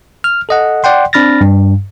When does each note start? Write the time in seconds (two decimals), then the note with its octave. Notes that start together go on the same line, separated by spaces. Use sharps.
0.24 F6
0.49 A4 D#5 F#5
0.84 D5 F#5 G5 C6
1.13 C4 D4 B5 F6 A6 A#6
1.41 G2